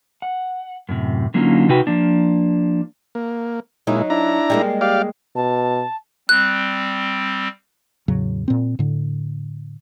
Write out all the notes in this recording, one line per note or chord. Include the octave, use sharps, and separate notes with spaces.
F#5
F#2 A2 C3
D3 F#3 A#3 C#4 D#4 F4
C3 D#4 F#4 B4 G5
F3 A#3 D4
A#3
A#2 F#3 G#3 D#4 E4
D4 E4 A#5
G3 G#3 A#3
G4 D5 F5
B2 A5
G3 C4 F#6
E2 A2 C#3 F#3
A#2 C4
A2 D3